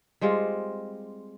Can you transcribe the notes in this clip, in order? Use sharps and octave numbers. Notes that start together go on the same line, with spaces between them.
G3 G#3 C4 F4